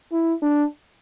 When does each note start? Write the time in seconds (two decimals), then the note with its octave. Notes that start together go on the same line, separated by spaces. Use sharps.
0.12 E4
0.42 D4